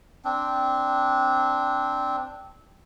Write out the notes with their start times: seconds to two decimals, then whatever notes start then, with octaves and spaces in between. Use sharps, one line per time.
0.25 C4 D4